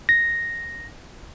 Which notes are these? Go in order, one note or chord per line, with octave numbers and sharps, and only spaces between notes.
A#6